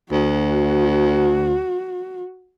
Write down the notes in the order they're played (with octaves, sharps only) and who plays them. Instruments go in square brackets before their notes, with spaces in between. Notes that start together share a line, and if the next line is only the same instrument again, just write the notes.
[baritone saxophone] D2 [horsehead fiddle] F#4